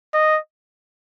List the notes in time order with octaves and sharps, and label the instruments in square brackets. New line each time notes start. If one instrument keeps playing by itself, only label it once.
[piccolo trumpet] D#5